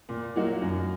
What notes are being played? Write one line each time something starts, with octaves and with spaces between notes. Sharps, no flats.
A#2
F#3 A#3 D#4 F#4
F#2